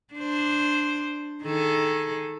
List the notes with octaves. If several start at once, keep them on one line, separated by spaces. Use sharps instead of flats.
D4 C5
D#3 G#4 A4